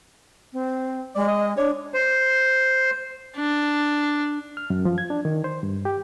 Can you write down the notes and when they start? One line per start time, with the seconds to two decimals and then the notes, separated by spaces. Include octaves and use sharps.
0.53 C4
1.15 G#3 D5
1.28 D#5
1.57 D4 C#5
1.94 C5
3.37 D4
4.57 F6
4.70 F#2
4.85 F3
4.98 G#6
5.10 D4
5.25 D#3
5.44 C5
5.63 G2
5.85 G4